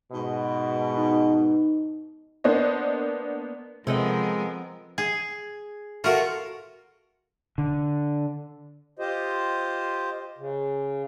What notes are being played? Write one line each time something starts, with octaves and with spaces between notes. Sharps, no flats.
G#2 B2
D#4
A#3 B3 D4 C5 D#5
C3 F3 G#3 B3 C4 A4 A#4 D#5
G#4
A3 F4 F#4 A#4
D3
F4 G4 C5 D#5
C#3